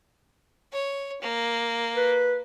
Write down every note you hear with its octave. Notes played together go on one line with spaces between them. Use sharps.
C#5
A#3
B4